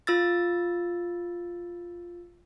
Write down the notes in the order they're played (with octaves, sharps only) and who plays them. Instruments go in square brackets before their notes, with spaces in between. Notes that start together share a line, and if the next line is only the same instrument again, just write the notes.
[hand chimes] F4 E6 A6